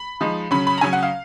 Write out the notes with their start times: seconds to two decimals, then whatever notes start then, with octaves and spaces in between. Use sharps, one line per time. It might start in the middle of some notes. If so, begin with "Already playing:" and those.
Already playing: B5
0.21 F3 G#3 D#4
0.51 C#3 F#3 C#4 B5
0.67 B5
0.78 A#5
0.81 C#3 F#3 C#4 G#5
0.93 F#5
1.03 F5